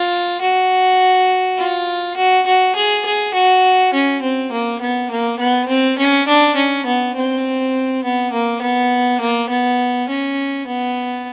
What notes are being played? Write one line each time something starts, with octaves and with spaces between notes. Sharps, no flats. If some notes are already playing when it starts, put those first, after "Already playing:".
Already playing: F4
F#4
F4
F#4
F#4
G#4
G#4
F#4
C#4
C4
A#3
B3
A#3
B3
C4
C#4
D4
C#4
B3
C4
B3
A#3
B3
A#3
B3
C#4
B3